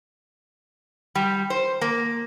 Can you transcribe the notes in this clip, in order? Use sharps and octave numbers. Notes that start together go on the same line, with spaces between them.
G3
C5
A#3